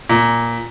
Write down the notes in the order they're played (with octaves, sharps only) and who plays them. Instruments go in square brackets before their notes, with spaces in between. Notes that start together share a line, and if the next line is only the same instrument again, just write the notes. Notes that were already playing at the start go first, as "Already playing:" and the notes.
[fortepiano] A#2